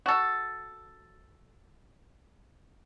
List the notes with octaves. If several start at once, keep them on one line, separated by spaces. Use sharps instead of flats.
F#4 A4